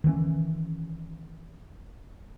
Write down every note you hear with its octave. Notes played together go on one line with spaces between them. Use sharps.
D#3 E3 G3 C#4